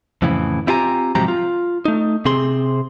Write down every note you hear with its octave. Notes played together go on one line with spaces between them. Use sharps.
F2 A2 C#3 E3
C4 E4 F4 G4 G#5 A#5
G#2 C3 F3 F#3 G4 A#5
F4
A3 D#4
C3 C4 G#4 C6